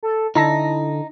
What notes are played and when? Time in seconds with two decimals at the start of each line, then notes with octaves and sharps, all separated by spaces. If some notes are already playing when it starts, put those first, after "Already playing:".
0.03 A4
0.35 D3 D#4 E4 A5 A#6